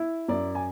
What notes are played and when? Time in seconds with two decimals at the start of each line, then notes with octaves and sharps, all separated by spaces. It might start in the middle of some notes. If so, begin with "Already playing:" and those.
Already playing: E4
0.28 F#2 D5
0.55 G#5